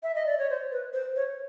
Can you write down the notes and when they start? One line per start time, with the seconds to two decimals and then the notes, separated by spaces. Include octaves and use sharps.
0.03 E5
0.15 D#5
0.26 D5
0.38 C#5
0.50 C5
0.72 B4
0.93 C5
1.16 C#5